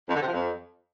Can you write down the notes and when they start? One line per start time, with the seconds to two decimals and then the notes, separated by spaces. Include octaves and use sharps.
0.08 F2
0.14 D3
0.21 C3
0.27 F3
0.33 F2